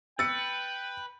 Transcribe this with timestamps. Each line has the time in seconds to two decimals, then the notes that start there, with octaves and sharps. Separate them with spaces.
0.19 B4 G5 E6 A6 C#7